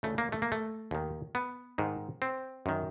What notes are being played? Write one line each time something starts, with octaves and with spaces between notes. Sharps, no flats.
D2 C#3 E3 A3
A#3
A3
A#3
A3
D#2 D#3
B3
G#2 D#3
C4
F#2 D#3